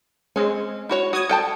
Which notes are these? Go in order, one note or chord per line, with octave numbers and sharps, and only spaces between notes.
G#3 C4 C#4
E4 F#4 C#5
F#4 D#6 G#6
A4 G5 A5